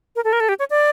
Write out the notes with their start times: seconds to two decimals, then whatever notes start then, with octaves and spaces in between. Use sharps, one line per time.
0.16 A#4
0.24 A4
0.33 A#4
0.40 A4
0.49 G4
0.59 C#5
0.70 D5